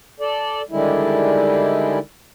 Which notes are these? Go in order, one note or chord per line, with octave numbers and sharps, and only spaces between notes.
A4 D5
D3 D#3 G3 G#3 E4